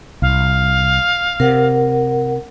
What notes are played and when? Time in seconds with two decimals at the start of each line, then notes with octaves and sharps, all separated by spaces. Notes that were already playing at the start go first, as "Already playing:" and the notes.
0.22 C2 F5
1.40 C3 A#4 F#5